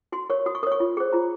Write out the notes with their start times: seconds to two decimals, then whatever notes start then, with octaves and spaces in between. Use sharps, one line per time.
0.12 F#4 C6
0.30 A#4 C#5 C#6
0.46 F#4 D#6
0.55 C#6
0.63 A#4 D#6
0.67 C#5 C#6
0.80 F4
0.97 G#4 C5
1.13 F4 A#5